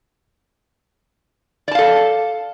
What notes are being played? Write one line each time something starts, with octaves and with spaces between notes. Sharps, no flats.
A4 D5 F5 A5